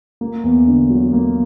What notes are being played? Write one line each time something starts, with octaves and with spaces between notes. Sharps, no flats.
A#3
E2
D3
F#3
A#3